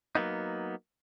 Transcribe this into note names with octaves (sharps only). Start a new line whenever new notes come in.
F#3 A#3 B3 D#4